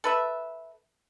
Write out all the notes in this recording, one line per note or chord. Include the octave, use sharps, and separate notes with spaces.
A4 B4 E5